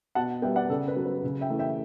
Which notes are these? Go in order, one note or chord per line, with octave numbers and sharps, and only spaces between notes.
B2 F#5 A5
G3 B3 E5 G5
D5 F#5
C#3 A4
B4
F#3 B3
B4
C#3
E5 G5
E3 A3
E5 G5